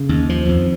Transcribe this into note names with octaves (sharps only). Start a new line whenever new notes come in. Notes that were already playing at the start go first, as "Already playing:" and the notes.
Already playing: C#3
D#2
F3
F2